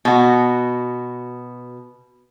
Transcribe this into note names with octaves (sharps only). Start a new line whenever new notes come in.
B2 F#4